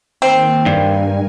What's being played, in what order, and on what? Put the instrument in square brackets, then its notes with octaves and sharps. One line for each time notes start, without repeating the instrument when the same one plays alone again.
[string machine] D#3 A#3 [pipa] C4
[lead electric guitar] G2 [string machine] A#4 G#5